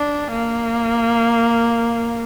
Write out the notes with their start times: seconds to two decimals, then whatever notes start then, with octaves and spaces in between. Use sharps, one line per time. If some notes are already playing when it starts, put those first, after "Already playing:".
Already playing: D4
0.32 A#3